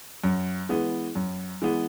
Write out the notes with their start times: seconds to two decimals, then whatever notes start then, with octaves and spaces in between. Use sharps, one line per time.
0.24 F#2
0.69 E3 G#3 B3
1.15 F#2
1.62 E3 G#3 B3